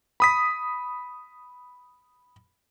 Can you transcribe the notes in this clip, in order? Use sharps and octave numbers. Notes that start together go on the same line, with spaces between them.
B5 D#6 B6